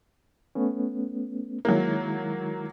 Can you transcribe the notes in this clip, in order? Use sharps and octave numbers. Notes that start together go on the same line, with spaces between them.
A3 B3 C#4
D#3 F#3 G#3 A#3 E4